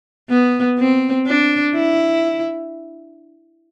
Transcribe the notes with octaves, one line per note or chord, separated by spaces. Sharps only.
B3
C4
D4
E4